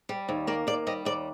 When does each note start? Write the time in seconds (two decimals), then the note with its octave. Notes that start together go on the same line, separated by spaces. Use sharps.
0.09 G3
0.29 D#2
0.47 A#3 D5
0.67 D#2 D5
0.87 G3 D#5
1.05 D#2 D5